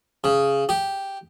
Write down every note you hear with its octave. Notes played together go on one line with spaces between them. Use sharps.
C#3
G4